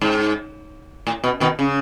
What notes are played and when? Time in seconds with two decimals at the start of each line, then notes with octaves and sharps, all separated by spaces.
0.01 G#2
1.07 A2
1.24 B2
1.40 B2 D#3
1.59 C#3